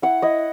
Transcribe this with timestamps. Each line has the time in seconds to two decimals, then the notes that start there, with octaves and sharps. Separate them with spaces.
0.02 E4 F#5
0.22 E4 D#5